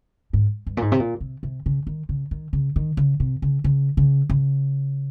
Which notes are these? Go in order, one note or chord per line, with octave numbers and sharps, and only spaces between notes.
G#2
G2
A#2
G#2
C3
A#2
C3
C3
C#3
D#3
C#3
D#3
C#3
D#3
C#3
C3
C#3
C#3
C#3
C#3